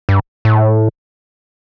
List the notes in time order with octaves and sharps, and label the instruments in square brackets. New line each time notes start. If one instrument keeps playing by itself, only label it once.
[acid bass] G2
A2